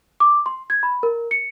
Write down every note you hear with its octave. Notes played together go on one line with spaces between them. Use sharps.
D6
C6
G#6
B5
A#4
C#7